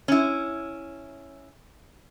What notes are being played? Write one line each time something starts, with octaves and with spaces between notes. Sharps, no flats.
C#4 E4